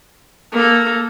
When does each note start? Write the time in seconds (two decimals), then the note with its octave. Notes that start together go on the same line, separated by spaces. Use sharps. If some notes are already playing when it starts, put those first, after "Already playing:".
0.52 A#3 A4